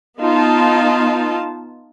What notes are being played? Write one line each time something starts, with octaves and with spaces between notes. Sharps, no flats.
B3 D#4 F4 A5